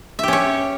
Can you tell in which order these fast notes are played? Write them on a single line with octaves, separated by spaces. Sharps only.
E5 G4 C#4 C#5